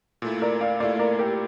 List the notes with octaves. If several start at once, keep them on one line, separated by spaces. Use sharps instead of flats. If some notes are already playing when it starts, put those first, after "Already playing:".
A#2 A3 E4
A#4 D5
D5 F5
A#2 A3 E4 D5 F5
A#4 D5
G4 A#4